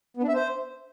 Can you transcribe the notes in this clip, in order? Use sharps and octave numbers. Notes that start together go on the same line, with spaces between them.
B3
D4
E5
C5